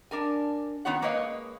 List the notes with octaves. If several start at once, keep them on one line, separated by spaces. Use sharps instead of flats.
D4 A#4 G#5
D#3 B3 C#4 F4 C#5 F#5
G#3 A#3 B4 C#5 D#5 F5